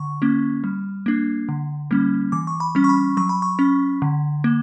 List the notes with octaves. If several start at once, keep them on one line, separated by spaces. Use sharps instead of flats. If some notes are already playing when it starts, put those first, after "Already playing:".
Already playing: D3 C#6
A#3 C#4
G3
A#3 D4
D3
G3 A#3 C#4
E3 D6
C#6
B5
G3 C#4
C#6
B5
F#3 C#6
B5
C#6
C#4
D3
A#3